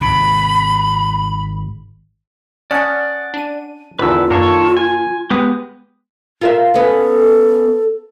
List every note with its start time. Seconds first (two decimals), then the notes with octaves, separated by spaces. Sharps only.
0.01 G#1 C3 B5
2.71 C#4 D5 F#5 A5 D#6 F6
3.34 D4 D#7
3.99 E2 D3 D#3 F4 B4 E6
4.30 F#2 D#3 A#3 D4 A4 A#4 C#5
4.77 G#5
5.30 G#3 B3 G4 B4 D#6
6.41 F4 A#4 E5
6.74 B3 C#4 A4